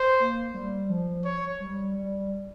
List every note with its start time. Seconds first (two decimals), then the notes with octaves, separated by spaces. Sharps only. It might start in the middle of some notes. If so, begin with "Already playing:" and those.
Already playing: C5
0.20 A#3
0.54 G3
0.89 F3
1.24 C#5
1.60 G3
1.95 G3